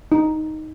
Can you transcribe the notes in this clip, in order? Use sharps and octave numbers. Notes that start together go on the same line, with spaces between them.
D#4